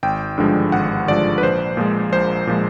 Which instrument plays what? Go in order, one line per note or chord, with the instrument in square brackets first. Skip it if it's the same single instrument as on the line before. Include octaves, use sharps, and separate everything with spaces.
[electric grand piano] G#1 G5
G2 D3 F3 G#3
G#1 F#5
G2 D3 F3 G#3 D5
B4
A#1 C5
A#2 F3 G#3
A#1 C5
A#2 F3 G#3